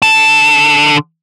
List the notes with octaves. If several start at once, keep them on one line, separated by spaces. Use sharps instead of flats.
D3 A5